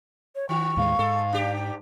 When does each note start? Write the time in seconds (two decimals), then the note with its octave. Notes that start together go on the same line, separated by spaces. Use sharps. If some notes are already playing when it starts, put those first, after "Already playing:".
0.35 C#5
0.49 D#3 F#4 C#6
0.77 D#2 A2 G#3 F5
0.99 G#2 A4
1.33 D4 G4